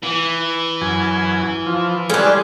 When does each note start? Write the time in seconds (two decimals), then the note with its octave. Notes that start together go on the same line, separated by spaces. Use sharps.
0.03 E3
0.81 F#2 G#5
1.66 F3
2.10 G3 G#3 C#4 D4 G#4 A4